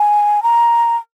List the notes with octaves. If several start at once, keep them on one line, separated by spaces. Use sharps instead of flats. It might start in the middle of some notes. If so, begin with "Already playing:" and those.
Already playing: G#5
A#5